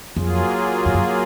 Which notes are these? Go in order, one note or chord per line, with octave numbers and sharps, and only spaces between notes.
F2 F#3 A#3 F4 G#4
F2
F#2